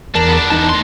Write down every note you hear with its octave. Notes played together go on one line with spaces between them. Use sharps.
E2 D4 A#4 A5
B3 D4
E2 D#4 A5
A3 C6